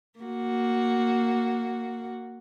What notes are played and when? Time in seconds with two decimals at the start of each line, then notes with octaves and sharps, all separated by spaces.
0.20 A#3 F#4